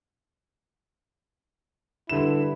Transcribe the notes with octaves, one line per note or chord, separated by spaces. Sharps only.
G2 D3 E4 E7